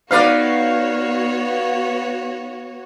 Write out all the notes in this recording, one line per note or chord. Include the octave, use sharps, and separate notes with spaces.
B3 D#4 F#4 B4 C#5 D5 F5